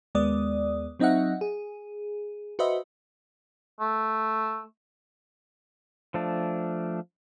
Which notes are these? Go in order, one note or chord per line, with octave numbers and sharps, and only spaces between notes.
D#2 G#3 B3 D5 D#6
F#3 C4 D#4 D#5 E5 F#5
G#4
F#4 B4 C5 D#5 E5
A3
F3 A3 D4